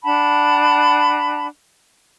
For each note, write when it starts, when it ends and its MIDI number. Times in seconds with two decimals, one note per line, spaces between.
0.04 1.47 62
0.04 1.47 78
0.04 1.47 81
0.04 1.47 83